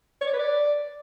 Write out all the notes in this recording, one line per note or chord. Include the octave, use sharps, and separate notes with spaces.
C#5
D5
B4
D5